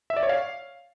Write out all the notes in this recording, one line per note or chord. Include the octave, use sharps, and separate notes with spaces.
E5
D5
C#5
F5